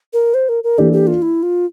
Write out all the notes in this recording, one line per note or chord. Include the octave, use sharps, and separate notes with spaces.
A#4
C5
A#4
A#4
E3 A#3 D4 G4 A4 D5
G4
F4
E4
F4